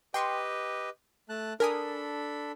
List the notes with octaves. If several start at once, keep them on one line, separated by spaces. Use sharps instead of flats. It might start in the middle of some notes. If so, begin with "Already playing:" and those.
G4 B4 D#5 G5 C6 C#6
A3 A5 F#6
D4 A4 A#4 G#5 B5 D#6